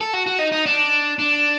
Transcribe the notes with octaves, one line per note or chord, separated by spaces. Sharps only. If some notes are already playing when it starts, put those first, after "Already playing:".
A4
F#4
F#4
D#4
D#4
D4
D4